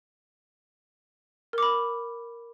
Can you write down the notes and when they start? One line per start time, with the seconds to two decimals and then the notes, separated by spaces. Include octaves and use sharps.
1.53 A#4
1.58 D6
1.63 B5